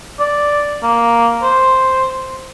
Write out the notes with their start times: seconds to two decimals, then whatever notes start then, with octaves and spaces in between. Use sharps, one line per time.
0.19 D5
0.83 A#3
1.43 C5